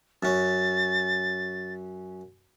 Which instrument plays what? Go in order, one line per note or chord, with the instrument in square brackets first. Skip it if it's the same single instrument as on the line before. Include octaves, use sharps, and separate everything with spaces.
[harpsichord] F#2 C#4 [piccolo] A6